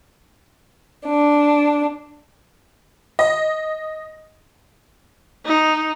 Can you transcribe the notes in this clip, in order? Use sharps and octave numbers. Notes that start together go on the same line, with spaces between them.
D4
D#5
D#4